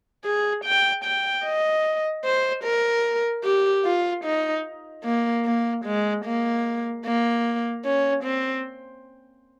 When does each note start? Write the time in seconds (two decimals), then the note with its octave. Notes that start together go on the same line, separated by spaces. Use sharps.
0.25 G#4
0.64 G5
1.04 G5
1.45 D#5
2.24 C5
2.64 A#4
3.44 G4
3.85 F4
4.24 D#4
5.05 A#3
5.45 A#3
5.85 G#3
6.25 A#3
7.05 A#3
7.85 C#4
8.24 C4